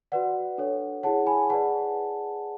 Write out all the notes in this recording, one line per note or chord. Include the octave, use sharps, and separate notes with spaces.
F#4 B4 D5 F#5
D4 A4 C#5
E4 G#4 C#5 F#5 A5
G#5 B5
G#4 B4 D5 F#5 A5